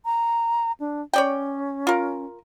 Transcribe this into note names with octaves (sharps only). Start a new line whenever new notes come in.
A#5
D4
C#4 C#5 D5 G5
F4 A#4